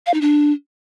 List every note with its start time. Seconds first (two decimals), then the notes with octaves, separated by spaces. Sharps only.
0.07 F5
0.14 D#4
0.21 D4